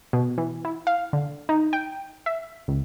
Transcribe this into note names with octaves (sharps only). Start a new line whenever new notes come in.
B2
E3
E4
F5
D3
D#4
G5
E5
C#2